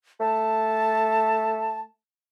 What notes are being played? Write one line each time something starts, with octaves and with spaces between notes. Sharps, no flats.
A3 A5